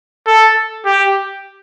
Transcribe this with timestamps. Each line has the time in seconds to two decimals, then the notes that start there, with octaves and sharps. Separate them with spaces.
0.27 A4
0.86 G4